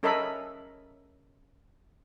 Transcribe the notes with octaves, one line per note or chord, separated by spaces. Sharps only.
C#4 A4 A#4 D#5 E5 B5